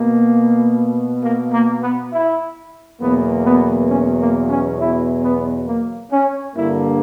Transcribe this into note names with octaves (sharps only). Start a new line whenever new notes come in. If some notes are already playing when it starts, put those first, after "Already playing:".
Already playing: B2 A#3
A#3
A#3
B3
E4
E2 B2 F#3 A#3 B3
B3
C#4
A#3
C#4
E4
B3
A#3
C#4
G2 D3 A#3 E4